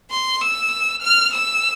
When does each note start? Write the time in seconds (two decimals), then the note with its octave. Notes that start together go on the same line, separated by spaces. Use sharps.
0.11 C6
0.41 E6
1.02 F6
1.33 E6